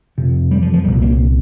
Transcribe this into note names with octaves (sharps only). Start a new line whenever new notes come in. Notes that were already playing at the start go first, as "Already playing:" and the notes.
F2 C3
G3
F3
F3
C2 A#2 G3
A#3